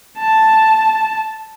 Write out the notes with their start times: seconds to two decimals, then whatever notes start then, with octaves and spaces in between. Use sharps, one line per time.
0.18 A5